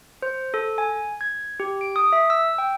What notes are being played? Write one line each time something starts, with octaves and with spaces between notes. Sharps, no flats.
C5
A4
G#5
G#6
G4
D7
D#6
E5
E6
G5